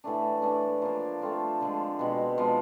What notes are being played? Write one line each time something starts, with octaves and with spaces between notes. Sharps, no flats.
A2 E3 A3 D4
E3 A3 D4
F3 A#3 D4
A3 C4 F4 A4
D3 F3 G#3
B2 G#3 C4
F3 G#3 B3